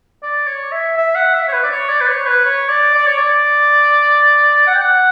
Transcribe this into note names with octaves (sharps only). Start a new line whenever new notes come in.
D5
C#5
E5
E5
F#5
E5
C#5
B4
D5
C#5
D5
B4
C#5
B4
C#5
D5
D5
C#5
D5
F#5
G5
F#5